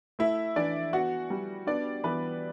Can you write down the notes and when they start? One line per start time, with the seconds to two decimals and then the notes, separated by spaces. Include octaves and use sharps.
0.19 A3 E4 E5
0.56 E3 D4 D5
0.93 B3 F#4 F#5
1.30 G3
1.67 B3 D4 D5
2.04 E3 B3 B4